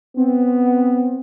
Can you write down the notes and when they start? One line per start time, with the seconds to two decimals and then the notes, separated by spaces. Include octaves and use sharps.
0.17 B3 C4